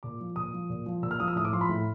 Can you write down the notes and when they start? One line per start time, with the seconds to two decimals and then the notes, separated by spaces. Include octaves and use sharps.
0.03 A#2 D6
0.20 F3
0.36 A#2 D#6
0.54 F3
0.70 A#2
0.86 F3
1.03 A#2 E6
1.11 F6
1.20 F3 D#6
1.28 E6
1.36 A2 D#6
1.45 D6
1.52 F3 C6
1.61 B5
1.69 A2